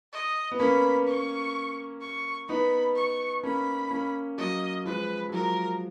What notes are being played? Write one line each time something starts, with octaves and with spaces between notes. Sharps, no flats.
D#5
B3
A#3 C#4 B5
C#6
C#6
B3 D#4 B5
C#6
A#3 C#4 B5
A#3 C#4
F#3 A#3 D#5
F3 G#3 B4
F#3
F3 A#4